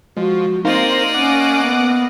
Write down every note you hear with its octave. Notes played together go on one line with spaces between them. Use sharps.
F3 G#3 F#4
A#3 C4 D#4 A#4 C5 D5 D#5 F5
C#4 F#5 D6
B3